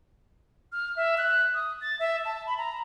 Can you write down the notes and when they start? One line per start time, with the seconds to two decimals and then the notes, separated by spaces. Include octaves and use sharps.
0.72 F6
0.96 E5
1.18 F#6
1.54 D#6
1.81 A6
1.99 E5
2.25 A5
2.47 B5
2.58 A#5